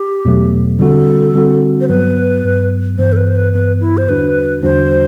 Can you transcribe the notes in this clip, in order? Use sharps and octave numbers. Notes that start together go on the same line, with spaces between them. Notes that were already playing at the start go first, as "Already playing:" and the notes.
Already playing: G4
E2 B2 F#3 A3
D3 G3 C4 F#4 A4
D3 G3 C4 F#4
C5
G2 F#3 B3 B4
G2 F#3 B3
G2 E3 B3 C5
A4
B4
C5
B4
G2 E3 B3 B4
E4
C5
E2 D3 G3 D4 F#4 B4
E2 D3 G3 D4 F#4 C5